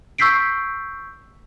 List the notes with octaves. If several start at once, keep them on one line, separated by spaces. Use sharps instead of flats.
C#6 E6 G6 B6 C7 D7